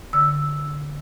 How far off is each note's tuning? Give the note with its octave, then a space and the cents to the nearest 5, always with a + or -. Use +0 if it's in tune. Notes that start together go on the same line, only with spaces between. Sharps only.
D3 -10 E6 +0